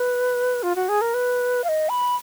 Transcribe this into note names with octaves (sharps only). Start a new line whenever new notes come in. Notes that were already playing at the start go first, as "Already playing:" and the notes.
Already playing: B4
F4
F#4
G#4
A#4
B4
F5
D#5
B5